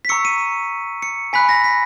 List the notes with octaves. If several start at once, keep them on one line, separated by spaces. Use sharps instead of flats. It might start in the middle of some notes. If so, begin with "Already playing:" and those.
B6
A#5 C#6 E6 C#7
D#7
C#7
G#5 B5 F#6 B6
A#6
B6